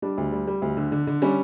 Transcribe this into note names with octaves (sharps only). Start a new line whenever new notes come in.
G3 D4
D2
G3
G3
D2
D3
D3
D3
G3 C#4